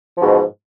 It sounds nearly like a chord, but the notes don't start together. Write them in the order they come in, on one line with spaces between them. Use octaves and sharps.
F3 G#2 B2